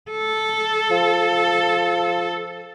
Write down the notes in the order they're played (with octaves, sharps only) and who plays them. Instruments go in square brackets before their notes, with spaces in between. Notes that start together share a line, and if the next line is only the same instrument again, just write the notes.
[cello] A4
[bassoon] F3